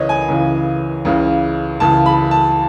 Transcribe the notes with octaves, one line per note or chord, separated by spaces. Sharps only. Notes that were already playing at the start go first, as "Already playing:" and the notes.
Already playing: C#2 C#3 E3 B4 C#5 D#5
G#5
C#2 C#3 E3
C#2 C#3 E3
C#2 C#3 E3 A5
B5
A5